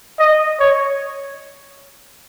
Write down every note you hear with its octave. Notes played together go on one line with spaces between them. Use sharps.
D#5
C#5